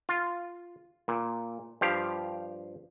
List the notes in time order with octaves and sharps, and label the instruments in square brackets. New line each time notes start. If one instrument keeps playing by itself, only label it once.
[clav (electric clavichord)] F4
A#2
G2 F3 G4 F5